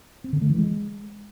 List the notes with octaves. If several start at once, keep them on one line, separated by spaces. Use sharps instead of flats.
C4
D3
A3
E3
G#3